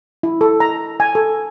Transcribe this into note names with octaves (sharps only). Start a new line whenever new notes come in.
E4
A4
A#5
G#5
A4